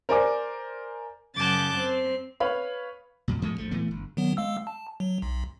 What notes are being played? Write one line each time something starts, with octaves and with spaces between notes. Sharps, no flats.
A#4 C5 D5 G#5 D6
F#2 C#3 A5 D6 F#6 G6
C4
B4 C#5 F5 B5
F2 A#2
G#2 F3 G#3 A3
A#1 F3 A3
A2 E3 A3 B3
G1
D#3 F#3 B3
G#3 F5 E6
A5
F#3
B1